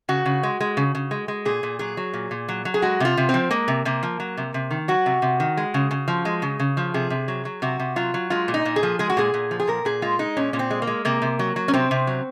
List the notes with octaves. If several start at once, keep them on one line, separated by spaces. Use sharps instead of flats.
C#3 F#4
C#3
G#3
G#3
C#3
C#3
G#3
G#3
A#2 G#4
A#2
F#3 G#4
F#3
A#2
A#2
F#3
F#3
G#4
G#3 F#4
C3 F4
C3
C4
F3
G#3 A#3
C3
C3 A#3
F3
F#3
C3
C3
D#3
F#3 F#4
C3
C3
D#3
G#3
C#3
C#3
F3
G#3
C#3
C#3
F3
C3 G#4
C3
F#3
F#3
C3 F#4
C3
F#3 F4
F#3
G#3 F4
A#2
D#4
A#2
G#4
F3
G#3 G#4
F#4
A#2 G#4
A#2
F3
G#4
A#2 A#4
A#2 G#4
G#3 F4
G#3 D#4
A#2 C#4
A#2 C#4
C4
G#3
A#3
G#3
C3 A#3
C3
F#3
F#3
C#4
C3 C4
C3
F#3